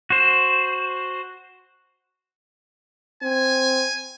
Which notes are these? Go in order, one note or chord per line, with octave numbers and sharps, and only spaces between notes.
F#4 C5
C4 G#5